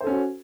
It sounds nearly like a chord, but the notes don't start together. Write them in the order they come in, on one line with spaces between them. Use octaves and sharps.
C5 A4 C#4 F#4